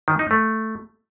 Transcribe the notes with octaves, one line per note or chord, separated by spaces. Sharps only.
D#3
D#4
A3